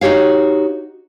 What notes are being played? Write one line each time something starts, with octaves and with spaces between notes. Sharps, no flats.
D#4 F#4 G4 C#5 F5